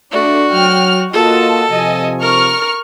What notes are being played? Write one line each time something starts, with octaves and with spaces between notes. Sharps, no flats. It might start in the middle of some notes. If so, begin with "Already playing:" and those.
A3 D4 F#4 D5
F#3 G5 F6
A#3 F4 F#4 A4 D#5 A5
C3 F3 D#5 G#5
A#4 C#6 F6